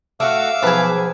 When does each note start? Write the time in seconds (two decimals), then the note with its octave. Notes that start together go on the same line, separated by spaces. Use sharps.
0.20 A3 F#4 F5 D6 E6
0.63 B1 F3 G#4 B4 A5